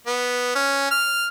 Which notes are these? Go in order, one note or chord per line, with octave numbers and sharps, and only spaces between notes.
B3
C#4
F6